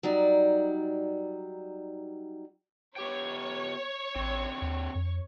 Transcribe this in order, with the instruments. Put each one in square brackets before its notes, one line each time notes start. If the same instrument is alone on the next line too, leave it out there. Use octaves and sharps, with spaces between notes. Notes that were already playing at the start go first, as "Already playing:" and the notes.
[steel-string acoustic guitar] F#3 G3 D#4 D5
[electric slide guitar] B3 G4 G5 [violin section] C#5
[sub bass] A1 [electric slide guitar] D3 C4
[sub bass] D#2
F2